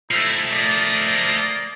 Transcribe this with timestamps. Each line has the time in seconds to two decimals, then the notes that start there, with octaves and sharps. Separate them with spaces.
0.11 F3 A3 D#4 E4
0.51 A#3 D5 D#5